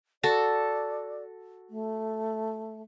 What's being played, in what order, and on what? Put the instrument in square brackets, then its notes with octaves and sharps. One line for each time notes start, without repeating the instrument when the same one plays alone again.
[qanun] F#4 A4 [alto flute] D5
[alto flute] A3